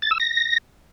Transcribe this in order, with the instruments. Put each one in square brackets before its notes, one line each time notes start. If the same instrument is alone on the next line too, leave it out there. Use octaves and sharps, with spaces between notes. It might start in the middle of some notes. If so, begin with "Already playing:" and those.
[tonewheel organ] A6
E6
A#6